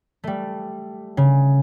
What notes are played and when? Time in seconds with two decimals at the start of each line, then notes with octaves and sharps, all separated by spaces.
0.24 G3 A3
1.17 C#3